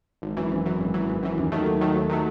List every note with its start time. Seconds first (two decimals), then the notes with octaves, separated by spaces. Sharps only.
0.22 G#1
0.37 F#2 E3
0.51 G#1
0.66 F#2 E3
0.80 G#1
0.94 F#2 E3
1.09 G#1
1.23 F#2 E3
1.37 D#2
1.52 D#3 F#3 A3
1.66 D#2
1.81 D#3 F#3 A3
1.94 D#2
2.10 D#3 F#3 A3